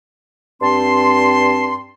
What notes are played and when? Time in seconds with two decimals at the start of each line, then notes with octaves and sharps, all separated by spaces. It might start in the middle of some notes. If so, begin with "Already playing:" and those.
0.62 G2 C4 A5 C6